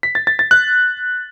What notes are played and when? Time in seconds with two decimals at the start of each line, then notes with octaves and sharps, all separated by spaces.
0.03 B6
0.15 A6
0.27 A6
0.39 A6
0.51 F#6